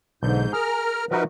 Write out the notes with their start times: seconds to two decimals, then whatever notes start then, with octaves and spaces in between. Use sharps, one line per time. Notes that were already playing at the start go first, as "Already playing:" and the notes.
0.23 B1 G#2 D3 G6
0.53 G#4 A#4 A#5 F6
1.11 F3 D#4 F#4 A#4 B4 E5